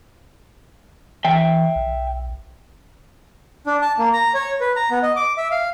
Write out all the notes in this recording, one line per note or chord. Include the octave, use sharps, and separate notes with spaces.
E3 E5 G5
B1
D4
A5
A#3
A#5
C#5
B4
A#5
B3
D#5
D6
E5
F5